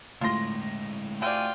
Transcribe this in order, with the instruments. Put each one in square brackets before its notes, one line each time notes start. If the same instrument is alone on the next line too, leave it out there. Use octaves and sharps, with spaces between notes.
[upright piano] A2 A#6 [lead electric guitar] D3 G#3 [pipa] F4 C6
[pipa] C3 F#4 D5 [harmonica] F4 G5 [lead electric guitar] G#5